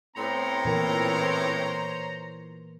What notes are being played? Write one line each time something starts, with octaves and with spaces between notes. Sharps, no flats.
A2 B3 C4 C5 C#5 A#5
A#2 E3 A#4